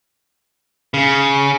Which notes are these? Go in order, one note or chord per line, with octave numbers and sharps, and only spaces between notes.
C#3